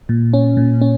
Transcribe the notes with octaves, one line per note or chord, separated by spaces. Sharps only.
A#2
C#4
A#2
C#4